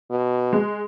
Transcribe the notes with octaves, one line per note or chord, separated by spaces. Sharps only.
B2
G#3